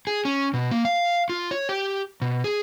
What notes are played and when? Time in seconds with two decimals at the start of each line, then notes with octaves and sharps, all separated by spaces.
0.07 G#4
0.25 C#4
0.54 B2
0.71 A#3
0.85 F5
1.29 F4
1.51 C#5
1.69 G4
2.22 B2
2.44 G#4